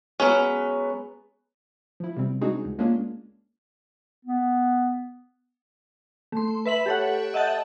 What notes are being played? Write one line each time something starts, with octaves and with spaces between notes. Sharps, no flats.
F#3 G#3 B3 C#4 B4
F3 E4
C3 G3 C4
G#3 C4 D4 D#4 F#4 G#4
C#2
G#3 A#3 C#4 D4 F4 G#4
B3
A3 C6
B4 E5 B6 F#7
G4 A4 C#5 F#5
D#5 E5 F#5 A5 G6 A6